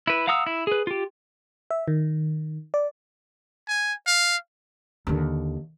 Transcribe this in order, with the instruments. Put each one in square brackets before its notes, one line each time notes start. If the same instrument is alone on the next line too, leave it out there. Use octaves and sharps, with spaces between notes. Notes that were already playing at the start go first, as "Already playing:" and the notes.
[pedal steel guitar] E4 B4
F5 F#5 A#5 D#6 E6
E4
G#4 B4
F4 G4
[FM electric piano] E5
D#3
D5
[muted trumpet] G#5
F5
[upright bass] D#2 D3